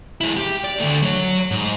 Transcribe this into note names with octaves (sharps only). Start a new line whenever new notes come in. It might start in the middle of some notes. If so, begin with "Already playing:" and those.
G#3 E4
G4
D5
D2 A3
F#3 C#5
G#2